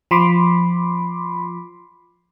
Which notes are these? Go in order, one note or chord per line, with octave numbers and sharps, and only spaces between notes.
F3 B5 C6 D6